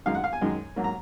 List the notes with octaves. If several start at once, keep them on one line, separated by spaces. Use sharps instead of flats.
F#2 D#3 G#3 F5
F#5
F5
G#5
F#2 D#3 G#3
G#2 F#3 A#3
A#5